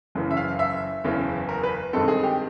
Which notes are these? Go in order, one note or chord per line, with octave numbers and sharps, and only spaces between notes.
F#1 F#2 C#3 E3
E5
F5
E5
F#1 E2 C#3 E3
A#4
B4
G2 D#3 G#3 C4 A4
G#4
G4